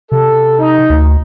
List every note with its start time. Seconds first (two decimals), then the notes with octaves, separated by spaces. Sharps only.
0.12 C3 A4
0.59 D#4
0.90 D2